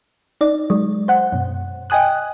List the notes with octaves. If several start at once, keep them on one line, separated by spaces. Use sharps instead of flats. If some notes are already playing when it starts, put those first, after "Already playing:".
D#4 D5
F#3 G#3
C5 F#5
F#2 B2
D#5 G5 G#5 D#6 F#6